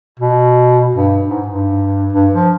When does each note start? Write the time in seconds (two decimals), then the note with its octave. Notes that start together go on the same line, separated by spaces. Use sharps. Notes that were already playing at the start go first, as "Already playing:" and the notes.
0.19 B2
0.95 G2
1.28 G#2
1.48 G2
2.13 G2
2.33 F3